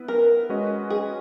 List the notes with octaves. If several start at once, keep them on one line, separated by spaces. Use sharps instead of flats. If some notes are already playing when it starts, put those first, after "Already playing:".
Already playing: B3 E4 B4
A#4
G#3 C#4 F#4 B4 D#5
G#4